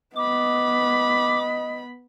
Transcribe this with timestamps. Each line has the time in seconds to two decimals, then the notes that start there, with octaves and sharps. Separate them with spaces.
0.16 B3 D#5 B5 D6